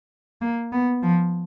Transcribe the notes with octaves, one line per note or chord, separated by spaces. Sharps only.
A#3
B3
F3